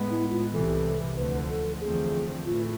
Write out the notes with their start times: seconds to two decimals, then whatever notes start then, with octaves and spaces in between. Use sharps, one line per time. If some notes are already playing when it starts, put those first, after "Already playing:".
Already playing: A2 G#3 B3
0.10 E4
0.30 F4
0.53 C2 C3 E3 A4
1.16 D2 D3 F3 A3 B4
1.49 A4
1.81 E2 D3 F3 A3 C4 G#4
2.46 A2 E3 A3 F4